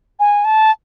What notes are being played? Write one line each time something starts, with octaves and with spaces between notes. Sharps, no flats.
G#5
A5